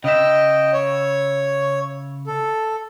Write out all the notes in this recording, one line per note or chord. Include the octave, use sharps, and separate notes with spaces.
C#3 D#5 E5 G5
C#5
A4